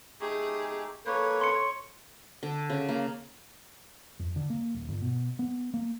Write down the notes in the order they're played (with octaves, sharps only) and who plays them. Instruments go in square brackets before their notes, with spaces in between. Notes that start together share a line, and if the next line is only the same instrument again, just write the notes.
[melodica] A3 D#4 G4 [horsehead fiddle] G#4
[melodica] A#3 B4 [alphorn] A4 [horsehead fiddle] C#5
[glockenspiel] C6 C#7
[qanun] D3
C#3
A#3
[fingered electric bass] F2
D3
A#3
D#1
G1
B2
B3
A#3